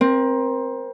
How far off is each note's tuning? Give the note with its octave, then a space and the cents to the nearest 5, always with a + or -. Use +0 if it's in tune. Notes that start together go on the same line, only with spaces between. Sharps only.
C4 +10 A#4 +30